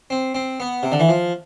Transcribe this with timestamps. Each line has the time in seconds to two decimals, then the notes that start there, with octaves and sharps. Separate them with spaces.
0.10 C4
0.34 C4
0.60 B3
0.83 C3
0.92 D3
1.00 E3
1.09 F3